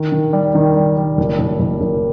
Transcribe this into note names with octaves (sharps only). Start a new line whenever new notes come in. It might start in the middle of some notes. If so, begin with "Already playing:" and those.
Already playing: D#3
D#3
G3
D#3
G3
G3
F#1
F#1
F#1
F#1